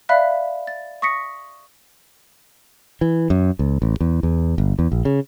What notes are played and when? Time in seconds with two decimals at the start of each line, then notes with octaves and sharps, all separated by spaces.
0.09 D5 E5 F5 B5 F#6 B6
0.67 A6
1.02 C#6 D#6 A#6 B6 C#7
3.01 E3
3.30 F#2
3.59 C#2
3.82 A1
4.01 E2
4.23 E2
4.58 G1
4.79 E2
4.92 A#1
5.05 C#3